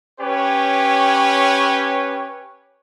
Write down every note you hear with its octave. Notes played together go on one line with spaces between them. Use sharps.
C#4 G4 B4 C#5